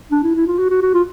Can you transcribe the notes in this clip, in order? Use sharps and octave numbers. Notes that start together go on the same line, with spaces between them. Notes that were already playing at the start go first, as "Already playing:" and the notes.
D4
E4
E4
F4
F#4
F#4
F#4
F4